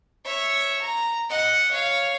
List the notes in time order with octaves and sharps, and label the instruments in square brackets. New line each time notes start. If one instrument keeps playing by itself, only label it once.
[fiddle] C#5 E5
A#5
D#5 F#5
C#5 F5